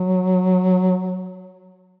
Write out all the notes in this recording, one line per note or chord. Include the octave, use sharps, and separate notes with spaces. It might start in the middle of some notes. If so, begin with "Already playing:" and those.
Already playing: F#3